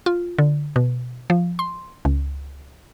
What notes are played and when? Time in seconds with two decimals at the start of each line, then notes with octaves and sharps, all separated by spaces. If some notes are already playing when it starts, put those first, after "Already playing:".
0.06 F4
0.38 D3
0.76 B2
1.30 F3
1.59 C6
2.05 C#2